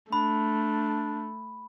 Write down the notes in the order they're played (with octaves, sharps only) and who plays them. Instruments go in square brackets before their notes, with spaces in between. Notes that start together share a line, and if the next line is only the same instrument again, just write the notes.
[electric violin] A3 [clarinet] D4 [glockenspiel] B5